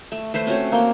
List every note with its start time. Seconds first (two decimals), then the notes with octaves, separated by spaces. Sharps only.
0.12 A3
0.34 A3 B4 C5 C6
0.47 C4 C#4 F#4 C#5
0.72 A#3 G5